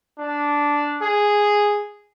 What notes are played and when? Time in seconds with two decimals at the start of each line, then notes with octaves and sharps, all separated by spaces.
0.18 D4
1.01 G#4